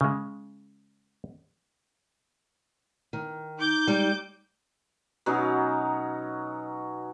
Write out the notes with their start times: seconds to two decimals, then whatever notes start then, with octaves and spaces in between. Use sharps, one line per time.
0.01 C#3 G#3
3.13 D#3
3.59 D#4 D6 G6
3.88 G3 G#3
5.26 B2 F#3 C#4 D#4